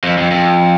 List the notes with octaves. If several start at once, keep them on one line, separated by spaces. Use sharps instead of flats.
F2
F2
F2